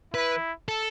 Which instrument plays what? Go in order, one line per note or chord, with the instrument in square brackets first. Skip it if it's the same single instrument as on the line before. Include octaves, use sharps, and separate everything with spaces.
[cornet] E4 [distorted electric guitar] B4
[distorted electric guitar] A4